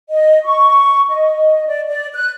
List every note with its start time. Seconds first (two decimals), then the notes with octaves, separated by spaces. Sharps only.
0.10 D#5
0.44 C#6
1.10 D#5
1.67 D5
1.88 D5
2.15 F#6